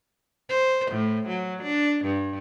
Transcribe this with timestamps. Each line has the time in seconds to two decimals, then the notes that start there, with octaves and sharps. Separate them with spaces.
0.50 C5
0.91 A2
1.29 F#3
1.63 D4
2.05 G2